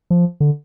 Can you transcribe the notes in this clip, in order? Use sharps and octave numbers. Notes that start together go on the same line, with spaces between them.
F3
D3